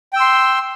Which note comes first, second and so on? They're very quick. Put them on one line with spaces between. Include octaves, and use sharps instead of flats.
G5 E6 C6